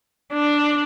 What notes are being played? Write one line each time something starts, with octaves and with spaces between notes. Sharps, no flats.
D4